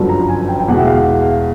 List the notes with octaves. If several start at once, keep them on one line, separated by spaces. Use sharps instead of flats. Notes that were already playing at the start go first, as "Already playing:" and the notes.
Already playing: G1 F#2 D3 F3
A#5
G#5
G5
G5
E2 B2 G#3 F#5
E5
F5
F#5
F5